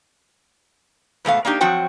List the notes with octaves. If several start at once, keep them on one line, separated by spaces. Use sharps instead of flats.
G#2 B2 A3 F5
A#3 D4 D#4 G4
F3 F#3 C4 F#4 G5